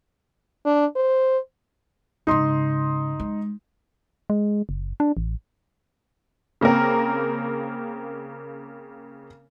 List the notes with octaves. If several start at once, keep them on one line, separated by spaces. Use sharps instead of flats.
D4
C5
G#2 C#3 D#4 C6
G#3
G#3
F#1
D4
A1
C#3 A#3 C4 A#4